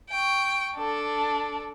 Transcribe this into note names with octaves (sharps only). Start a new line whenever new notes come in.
G5 C#6
D4 A4